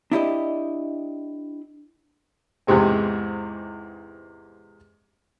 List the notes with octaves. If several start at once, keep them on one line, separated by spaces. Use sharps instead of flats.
D4 E4 G4 D#5
E2 G#2 C3 G#3 C4